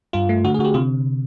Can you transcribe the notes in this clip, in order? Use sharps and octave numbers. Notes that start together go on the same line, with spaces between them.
G2 F4
A3
D3 F#4
G#4
D3 F#4
G4
C3 F4